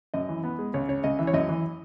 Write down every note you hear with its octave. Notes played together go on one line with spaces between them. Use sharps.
F#2 D#5
E3
B3
G#3
C#2 C#5
C#3 C#5
C#2 D#5
E3 E5
C#5
F#2 D#5
E3